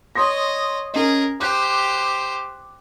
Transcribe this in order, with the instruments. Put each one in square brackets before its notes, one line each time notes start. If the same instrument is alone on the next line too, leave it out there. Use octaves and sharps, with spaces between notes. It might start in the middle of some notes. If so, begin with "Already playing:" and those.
[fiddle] C#5 D#5 [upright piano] C6 D#6 A#6
[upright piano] C#4 D#5 [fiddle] G#4 A#4
[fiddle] G4 C5 [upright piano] D6 F#6 G6